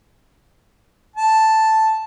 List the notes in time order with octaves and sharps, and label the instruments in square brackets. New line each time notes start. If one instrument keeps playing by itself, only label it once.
[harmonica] A5